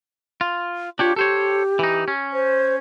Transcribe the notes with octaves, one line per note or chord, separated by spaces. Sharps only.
F4
D4 F4 G4 C#5
G4 A4 C5 C#5
E3 D#4
C#4
C5